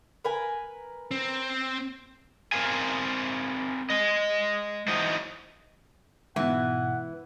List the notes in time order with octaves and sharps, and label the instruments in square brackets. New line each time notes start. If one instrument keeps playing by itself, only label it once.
[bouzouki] A#4 B4 G#5
[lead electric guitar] C4
[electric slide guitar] C4 A#4 C5 F5 G#5
G#3 D#5
E3 F#3 D#4 F#4 C5 D#5
[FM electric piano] G#2 B2 [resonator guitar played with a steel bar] E3 [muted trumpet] F#5